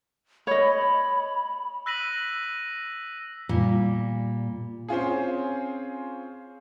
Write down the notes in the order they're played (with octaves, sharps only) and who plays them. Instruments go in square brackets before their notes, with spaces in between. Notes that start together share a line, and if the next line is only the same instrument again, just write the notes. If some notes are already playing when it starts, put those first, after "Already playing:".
[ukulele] C#5 D#5 [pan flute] B5
[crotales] E6 F#6 A#6 B6 D#7 F#7
[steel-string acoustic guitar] A#2 G3
[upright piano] C4 C#4 F4 G#4